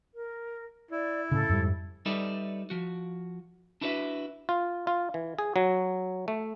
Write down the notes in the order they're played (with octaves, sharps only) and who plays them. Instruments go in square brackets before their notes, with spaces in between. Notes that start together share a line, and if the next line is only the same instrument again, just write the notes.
[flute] A#4
[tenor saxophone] E4 [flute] D5
[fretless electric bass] A2 C#3 [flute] A4
[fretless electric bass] F2 G#2 G3
[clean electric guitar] G3 D#4 A4 B4 D5 E5
F3 F#4
D4 E4 F#4 B4 C#5 E5
[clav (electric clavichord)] F4
F4
E3
G#4
F#3
A3